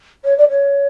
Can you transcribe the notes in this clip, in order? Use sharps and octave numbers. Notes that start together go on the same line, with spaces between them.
C#5
D5
C#5